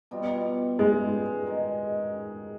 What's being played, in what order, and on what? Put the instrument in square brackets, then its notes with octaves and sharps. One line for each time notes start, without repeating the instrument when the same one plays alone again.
[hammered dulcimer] B2 G3 B3 F4
[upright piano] G#3
[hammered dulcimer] D#3 G#3